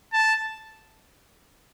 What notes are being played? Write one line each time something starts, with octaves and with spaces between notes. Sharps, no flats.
A5